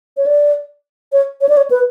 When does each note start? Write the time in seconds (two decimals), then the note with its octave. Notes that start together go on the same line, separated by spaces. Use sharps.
0.17 C#5
0.26 D5
1.12 C#5
1.41 C#5
1.49 D5
1.57 C#5
1.71 B4